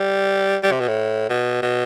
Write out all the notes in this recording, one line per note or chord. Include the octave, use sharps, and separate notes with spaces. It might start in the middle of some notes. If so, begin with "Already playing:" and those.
Already playing: G3
G3
C3
B2
A2
B2
B2